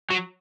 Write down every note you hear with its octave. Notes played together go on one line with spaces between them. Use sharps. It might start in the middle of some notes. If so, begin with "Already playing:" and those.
F#3